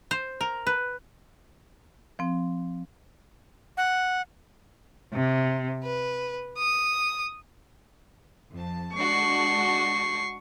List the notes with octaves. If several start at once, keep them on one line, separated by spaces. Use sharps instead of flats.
C5
A#4
B4
F3 C4
F#5
C3
B4
D#6
F2 A5
G#3 D4 F#4 C#6 C7